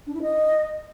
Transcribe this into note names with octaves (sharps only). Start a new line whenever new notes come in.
D4
E4
D#5